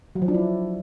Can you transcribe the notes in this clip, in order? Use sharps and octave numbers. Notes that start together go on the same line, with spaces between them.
F#3
F3
D4
E4